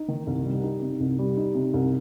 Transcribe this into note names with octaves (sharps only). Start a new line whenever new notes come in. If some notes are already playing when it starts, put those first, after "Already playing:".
Already playing: D#4
D#3
C2
G3
D#4
C3
C2
G3
D#4
C3
C2